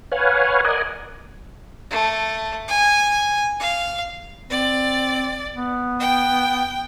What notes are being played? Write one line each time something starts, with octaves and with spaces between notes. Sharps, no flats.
B4 C#5 F5 F#5 G#5
A#4 D5 D#5 F#5 G#5
A3
G#5
F5
C4 D5
B3
G5